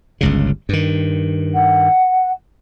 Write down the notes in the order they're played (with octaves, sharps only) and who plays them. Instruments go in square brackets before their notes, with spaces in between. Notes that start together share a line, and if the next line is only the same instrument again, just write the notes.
[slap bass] G1 C#2 C#3
G2 D#3
[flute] F#5